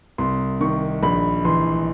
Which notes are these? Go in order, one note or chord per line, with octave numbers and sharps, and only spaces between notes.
C2 C6
D#3 C#6
A#1 B5
E3 C6